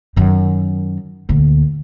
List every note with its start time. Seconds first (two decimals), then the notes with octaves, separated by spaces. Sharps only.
0.16 F#2 D#3
1.29 D2 A#2